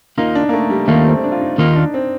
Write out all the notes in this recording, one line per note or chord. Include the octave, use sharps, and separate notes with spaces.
D#2 D#3 A#3 D#4 F4
D4
A#3
A3
G3
D#2 D#3 A3 A#3 F4
C4
C4
D4
F4
D#4
D#2 D#3 A#3 D#4 F4
D4
C4